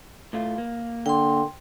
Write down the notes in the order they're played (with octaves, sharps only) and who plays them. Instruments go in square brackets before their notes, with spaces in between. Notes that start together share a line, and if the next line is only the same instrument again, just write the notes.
[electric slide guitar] A2 A3 F4
A#3
[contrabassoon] D3 [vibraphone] G5 C6